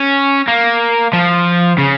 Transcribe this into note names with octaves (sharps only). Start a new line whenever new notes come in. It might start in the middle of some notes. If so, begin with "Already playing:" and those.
Already playing: C#4
A#3
F3
C#3